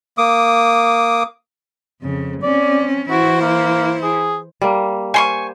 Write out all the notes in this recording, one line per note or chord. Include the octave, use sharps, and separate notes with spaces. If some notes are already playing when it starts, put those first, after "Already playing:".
A#3 D6 D#6
F2 C#3
C4 C#4 D5
E3 E4 F#4 C5
A#3
G#4
G3 A#3
C5 G#5 C6 C#6